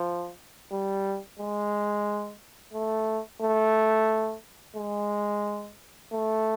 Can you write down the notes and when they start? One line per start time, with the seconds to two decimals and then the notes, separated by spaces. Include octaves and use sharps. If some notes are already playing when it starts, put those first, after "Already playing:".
Already playing: F3
0.72 G3
1.39 G#3
2.73 A3
3.41 A3
4.76 G#3
6.12 A3